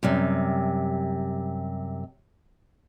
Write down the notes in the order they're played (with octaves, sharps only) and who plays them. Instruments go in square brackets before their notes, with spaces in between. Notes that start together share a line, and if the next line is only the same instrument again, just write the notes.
[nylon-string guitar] F#2 C3 G3